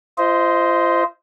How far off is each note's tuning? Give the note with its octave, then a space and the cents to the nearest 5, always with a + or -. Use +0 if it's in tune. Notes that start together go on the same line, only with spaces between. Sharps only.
F4 -35 C5 -10 D#5 +15